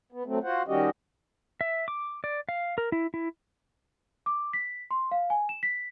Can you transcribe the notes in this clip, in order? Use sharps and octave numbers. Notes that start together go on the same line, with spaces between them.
B3
F#3 A3 C4
F4 F#4 C5 F#5
D#3 G3 C#4 F#4 G4 D#5
E5
D6
D5
F5
A#4
E4
E4
D6
B6
C6
F5
G#5
E7
B6